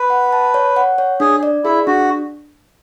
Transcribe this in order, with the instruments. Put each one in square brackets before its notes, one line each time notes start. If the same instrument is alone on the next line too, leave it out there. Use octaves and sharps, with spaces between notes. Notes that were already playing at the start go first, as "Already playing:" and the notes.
Already playing: [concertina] B4
[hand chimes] F#5
A5
C#5
F#5
C#5
[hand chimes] D4 [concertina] G#4
[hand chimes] D5
[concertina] E4 [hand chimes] G#4
[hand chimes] D4 [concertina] F#4